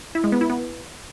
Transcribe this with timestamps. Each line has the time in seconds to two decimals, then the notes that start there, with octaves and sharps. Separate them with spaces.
0.15 E4
0.24 G#3
0.32 B3
0.41 E4
0.50 B3